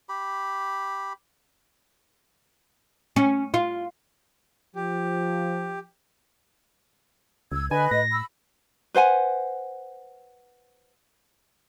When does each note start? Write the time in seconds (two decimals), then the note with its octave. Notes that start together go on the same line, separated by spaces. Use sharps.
0.09 G4 B5
3.16 C#4
3.54 F4
4.76 F3 G4
7.52 C#2 E6 G#6
7.71 D3 B4 D#5 G#5 B5
7.91 A2 A#6
8.12 B5 E6
8.94 B4 C5 F#5 G#5